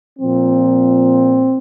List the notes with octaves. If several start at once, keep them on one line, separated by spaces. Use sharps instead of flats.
A#2 F3 C4